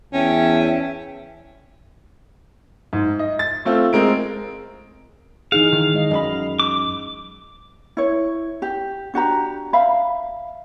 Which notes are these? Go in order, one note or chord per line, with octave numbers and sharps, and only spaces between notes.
E2 C#4 E5 G5 A5
G#2
D#5
A6
A3 C4 F4
G#3 C4 A#4 D7
E3 D#4 G#4 F5
D#3
G#3 D#5
F#2 A#4 D#5 B5
D6
E4 C#5
G4
D4 F#4 G4 A#5
E5 F5 B5